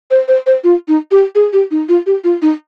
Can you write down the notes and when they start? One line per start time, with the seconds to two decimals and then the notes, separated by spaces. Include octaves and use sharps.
0.11 C5
0.28 C5
0.47 C5
0.64 F4
0.88 D#4
1.11 G4
1.35 G#4
1.53 G4
1.71 D#4
1.89 F4
2.06 G4
2.24 F4
2.42 D#4